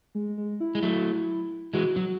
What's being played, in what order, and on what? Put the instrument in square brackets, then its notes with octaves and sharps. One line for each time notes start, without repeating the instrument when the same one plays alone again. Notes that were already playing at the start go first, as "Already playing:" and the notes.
[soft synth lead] G#3
G#3
E4
[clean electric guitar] G#3
F#3 A3
[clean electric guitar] E3 G#3 [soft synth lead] F#4
[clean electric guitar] F#3 [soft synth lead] F#4